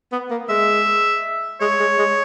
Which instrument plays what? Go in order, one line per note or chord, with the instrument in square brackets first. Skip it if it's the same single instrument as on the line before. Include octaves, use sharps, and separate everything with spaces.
[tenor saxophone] B3
A#3
[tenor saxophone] G#3 [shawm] E5
[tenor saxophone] G#3 [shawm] C#5
[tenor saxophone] G#3
G#3